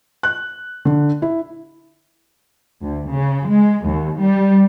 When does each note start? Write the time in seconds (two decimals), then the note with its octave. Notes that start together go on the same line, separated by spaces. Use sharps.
0.23 F#6
0.85 D3
1.22 E4
2.83 D2
3.12 C#3
3.48 G#3
3.86 D#2
4.23 G3